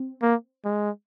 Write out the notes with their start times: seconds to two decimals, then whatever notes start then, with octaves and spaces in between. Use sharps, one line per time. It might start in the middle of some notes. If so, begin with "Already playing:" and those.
Already playing: C4
0.22 A#3
0.65 G#3